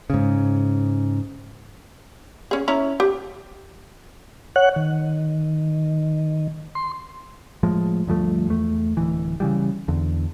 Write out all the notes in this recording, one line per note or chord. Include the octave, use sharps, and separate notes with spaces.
G#2 C#3
C#4 G#4
C#4 E4 A#5
G4
C#5 F#5 F#6
D#3
C6
A2 F3 G#3
D2 G2 F3 A3
E2 A3
D1 E3
C#3 E3 G3
E2 D3